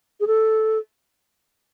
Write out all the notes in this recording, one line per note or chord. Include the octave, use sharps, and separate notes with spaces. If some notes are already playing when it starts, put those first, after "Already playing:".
G#4
A4